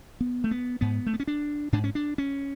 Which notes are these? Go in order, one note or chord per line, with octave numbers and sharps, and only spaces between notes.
B3
A3
B3
G#2 B3
A3
B3
C#4
D4
G#2 D4
C#4
D4
C#4